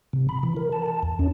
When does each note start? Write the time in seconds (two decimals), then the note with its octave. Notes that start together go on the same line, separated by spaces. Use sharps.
0.13 C3
0.29 B5
0.43 E3
0.57 A#4
0.72 A5
0.86 A5
1.03 E2
1.19 C#4